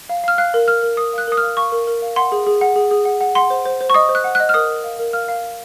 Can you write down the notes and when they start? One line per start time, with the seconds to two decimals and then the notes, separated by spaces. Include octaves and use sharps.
0.09 F5
0.24 F5 F6
0.38 F5 F#6
0.54 A#4
0.68 A#4 F6
0.83 A#4
0.97 A#4 D#6
1.13 F5 F#6
1.27 A#4 D#6
1.37 F6
1.43 F5
1.57 F5 C#6
1.72 A#4
1.87 A#4
2.02 F5
2.16 F#5 C6
2.32 G#4
2.47 G#4
2.61 F#5
2.76 G#4
2.91 G#4
3.05 F#5
3.21 F#5
3.35 F#5 C6
3.50 C5
3.66 C5
3.81 C5
3.90 C#6
3.94 D#5 D#6
4.09 C5
4.15 F#6
4.24 F#5
4.35 D#5 F#6
4.49 F6
4.54 A#4 D#6
4.69 A#4
4.84 F5
4.99 A#4
5.13 F5 F6
5.28 F5
5.43 F5